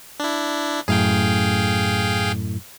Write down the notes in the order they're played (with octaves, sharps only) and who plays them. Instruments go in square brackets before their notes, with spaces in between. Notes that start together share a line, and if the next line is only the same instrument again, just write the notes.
[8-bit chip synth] D4 E4
[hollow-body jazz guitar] F#2 A2 [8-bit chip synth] G#4 F5 G5